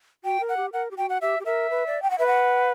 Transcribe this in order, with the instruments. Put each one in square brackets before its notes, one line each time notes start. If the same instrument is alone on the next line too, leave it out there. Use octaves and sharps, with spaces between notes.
[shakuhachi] F#4 [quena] G5
[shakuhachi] A#4
[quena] F#5
[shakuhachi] G4
[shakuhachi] A#4 [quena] F#5
[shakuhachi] G4
[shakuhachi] F#4 [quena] G5
[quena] F#5
[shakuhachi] G4 [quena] E5
[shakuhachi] G4
[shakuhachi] A#4 [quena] E5
[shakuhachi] B4
D5
G5
F#5
[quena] B4 [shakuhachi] E5
[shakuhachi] F#5